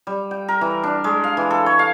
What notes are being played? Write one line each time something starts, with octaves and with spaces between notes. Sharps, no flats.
G3
G5
A#4
E3
D4
G#3
F5
E3
A4
C#5
F5